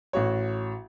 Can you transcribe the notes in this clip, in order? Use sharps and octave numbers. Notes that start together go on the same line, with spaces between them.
A1 F#4 C#5